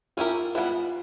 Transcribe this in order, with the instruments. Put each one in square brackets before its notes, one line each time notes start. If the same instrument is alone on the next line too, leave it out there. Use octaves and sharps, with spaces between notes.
[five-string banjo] C#4 E4 G4 A#4 [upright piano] F4
[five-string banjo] E3 G3 B3 [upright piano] F4